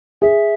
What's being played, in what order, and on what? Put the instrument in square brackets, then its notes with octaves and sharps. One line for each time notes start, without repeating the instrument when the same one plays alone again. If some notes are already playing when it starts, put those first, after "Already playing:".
[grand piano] G#4 [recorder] E5